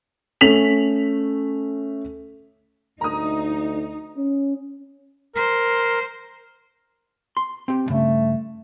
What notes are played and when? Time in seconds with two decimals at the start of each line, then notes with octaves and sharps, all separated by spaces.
0.41 A3 C#4 B6 F7 F#7
3.01 D2 D#4 A#5 D#6
4.17 C#4
5.35 A#4 C5
7.37 C6
7.68 C4 G4
7.86 B1 G2 C#3 A3